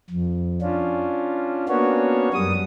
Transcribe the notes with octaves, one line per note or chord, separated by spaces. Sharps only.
F2
C#4 D4 F4
A#3 B3 C#4 D4 F#4 C#5
F#2 G3 D#6